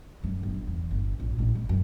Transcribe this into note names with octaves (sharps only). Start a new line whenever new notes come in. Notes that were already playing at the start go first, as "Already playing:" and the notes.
F#2
G1
E2
G1
A#1
A1
B2
F#2